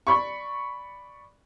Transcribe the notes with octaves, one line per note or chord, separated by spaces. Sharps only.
D5 B5 C#6